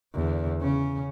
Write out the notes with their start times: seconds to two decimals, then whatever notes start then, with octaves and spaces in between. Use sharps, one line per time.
0.14 E2 D3
0.61 C#3 C#4